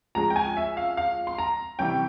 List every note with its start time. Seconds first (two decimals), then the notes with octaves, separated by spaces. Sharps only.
0.15 F3 G#3 C#4 A#5
0.30 G5
0.36 G#5
0.57 E5
0.77 F5
0.97 F5
1.27 C6
1.38 A#5
1.79 C3 E3 G3 C#4 G5